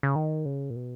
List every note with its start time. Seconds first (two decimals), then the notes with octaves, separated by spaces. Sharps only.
0.03 C#3
0.16 D#3
0.45 C#3
0.70 A#2
0.76 B2